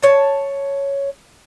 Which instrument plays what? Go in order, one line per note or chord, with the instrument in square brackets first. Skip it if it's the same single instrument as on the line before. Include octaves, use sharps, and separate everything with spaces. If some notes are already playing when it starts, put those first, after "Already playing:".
[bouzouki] C#5 A5